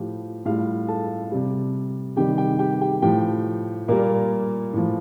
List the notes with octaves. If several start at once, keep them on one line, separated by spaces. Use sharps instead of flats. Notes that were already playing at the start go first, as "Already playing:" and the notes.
Already playing: A2 F3 G4
A2 G3 F4 F5
A4 A5
C3 G3
C3 D#3 G3 G4 G5
G4 G5
G4 G5
G4 G5
A2 F3 G4 G5
A#2 G3 A#3 A#4
A2 F3